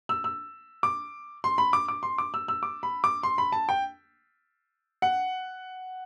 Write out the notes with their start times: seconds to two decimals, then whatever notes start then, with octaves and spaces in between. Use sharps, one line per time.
0.09 E6
0.24 E6
0.83 D6
1.44 C6
1.58 B5
1.73 D6
1.88 D6
2.03 C6
2.18 D6
2.34 E6
2.48 E6
2.63 D6
2.83 B5
3.04 D6
3.23 C6
3.38 B5
3.52 A5
3.69 G5
5.02 F#5